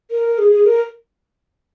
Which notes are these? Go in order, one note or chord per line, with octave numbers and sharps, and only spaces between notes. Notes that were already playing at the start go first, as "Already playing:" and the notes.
A#4
G#4
G#4
A#4